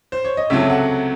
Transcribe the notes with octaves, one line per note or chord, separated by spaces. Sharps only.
C5
C#5
D#5
C#2 C3 F#3 A3 E5
F#5